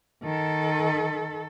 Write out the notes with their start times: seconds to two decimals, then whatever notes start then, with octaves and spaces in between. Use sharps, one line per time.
0.24 D#3 A4